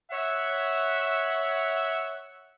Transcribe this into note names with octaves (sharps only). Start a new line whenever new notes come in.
C#5 E5 F#5